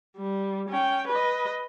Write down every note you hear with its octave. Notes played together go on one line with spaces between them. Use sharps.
G3
C#4 G5
B4 D#5